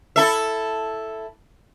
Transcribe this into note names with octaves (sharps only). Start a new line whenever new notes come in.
E4 A4 E5